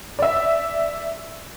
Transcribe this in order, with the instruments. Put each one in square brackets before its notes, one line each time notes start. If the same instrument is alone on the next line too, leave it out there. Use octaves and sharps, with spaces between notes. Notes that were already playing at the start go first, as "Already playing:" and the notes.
[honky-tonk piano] D5 E5